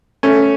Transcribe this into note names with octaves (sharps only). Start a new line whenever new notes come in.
A3 C#4